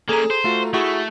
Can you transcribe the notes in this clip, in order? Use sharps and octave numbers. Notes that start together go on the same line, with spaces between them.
A#3 C#4 G#4 A4 A#5
C5
A3 F4 F#4
A3 E4 F#4 G#4